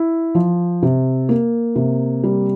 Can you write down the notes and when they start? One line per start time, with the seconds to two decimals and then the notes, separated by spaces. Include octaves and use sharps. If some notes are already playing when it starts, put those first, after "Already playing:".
Already playing: E4
0.35 F3
0.83 C3
1.29 A#3
1.76 C3
2.24 G3